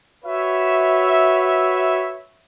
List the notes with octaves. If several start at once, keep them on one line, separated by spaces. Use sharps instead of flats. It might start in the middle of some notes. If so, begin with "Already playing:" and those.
F#4 B4 C#5 E5